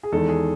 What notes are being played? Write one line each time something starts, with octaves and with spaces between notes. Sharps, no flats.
G#4
E2 D#3 G#3 A4
G#4